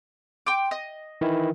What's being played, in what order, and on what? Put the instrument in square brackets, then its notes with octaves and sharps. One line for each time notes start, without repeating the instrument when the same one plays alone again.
[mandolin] G5 C6 D6
D#5
[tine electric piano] D#3 E3 E4